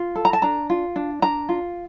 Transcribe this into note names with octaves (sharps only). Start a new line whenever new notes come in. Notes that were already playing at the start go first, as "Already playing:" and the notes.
Already playing: F4
A4
A#5
A5
D4 A#5
F4
D4
D4 A#5
F4